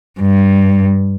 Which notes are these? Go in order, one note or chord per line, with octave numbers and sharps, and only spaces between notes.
G2